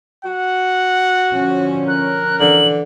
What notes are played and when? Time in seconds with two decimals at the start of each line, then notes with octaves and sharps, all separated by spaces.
0.25 F#4 F#5
1.33 D3 F3 C#4
1.88 A#4 F#6
2.40 D3 E3 F#7